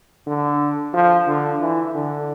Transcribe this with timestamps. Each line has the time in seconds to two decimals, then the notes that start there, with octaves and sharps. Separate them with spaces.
0.27 D3
0.94 F3
1.27 D3
1.61 E3
1.95 D3